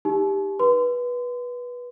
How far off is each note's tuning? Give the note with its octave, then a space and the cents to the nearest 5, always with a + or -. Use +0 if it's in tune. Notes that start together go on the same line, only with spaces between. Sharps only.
D#4 +0 G4 +10 A5 -45
B4 -15 C6 -30